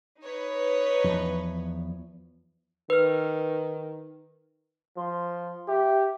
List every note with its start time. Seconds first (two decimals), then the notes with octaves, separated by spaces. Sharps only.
0.22 D#4 B4 C#5
1.04 E2 F3
2.90 D#3 B4 F6
4.97 F3 C6
5.68 G4 E5